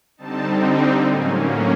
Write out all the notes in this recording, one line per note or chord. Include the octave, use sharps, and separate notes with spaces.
D3 G3 C4 D#4 A5
A2 F#3 A#3 C#4 G#5